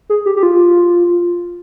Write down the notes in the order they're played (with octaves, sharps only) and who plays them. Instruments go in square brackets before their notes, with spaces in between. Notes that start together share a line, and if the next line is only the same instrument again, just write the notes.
[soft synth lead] G#4
G4
G4
F4